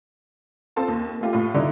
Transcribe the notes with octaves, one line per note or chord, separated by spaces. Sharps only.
C4 F4 A4 A5 C6
D#2
A3 F4 G4
A2 F4
D3 G3 D#4 E4